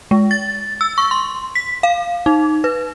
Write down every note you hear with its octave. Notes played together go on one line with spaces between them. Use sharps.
G#3
A6
E6
C#6
C6
B6
F5
D#4
B4